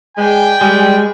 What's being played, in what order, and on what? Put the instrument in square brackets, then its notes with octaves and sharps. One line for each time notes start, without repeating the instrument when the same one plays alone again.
[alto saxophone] G#3 [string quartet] B4 D5 G#5 [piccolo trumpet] G5
[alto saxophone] G3 [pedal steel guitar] G#3